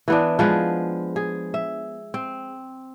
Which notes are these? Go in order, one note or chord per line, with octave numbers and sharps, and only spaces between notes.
E3 B3 D4
F3 G#3 B4
G#4
E5
C4